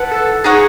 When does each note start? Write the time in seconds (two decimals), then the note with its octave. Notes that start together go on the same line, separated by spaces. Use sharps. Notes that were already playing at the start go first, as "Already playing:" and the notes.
Already playing: E4 B4 F#5 A5
0.11 A4
0.44 D#4 F#4 G#4 C#5